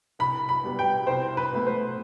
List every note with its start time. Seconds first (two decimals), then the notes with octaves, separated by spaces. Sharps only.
0.19 C2 B5
0.49 B5
0.64 B2 G3 B3
0.79 G5
1.07 C2 C5
1.37 B4
1.52 B2 A3
1.66 C5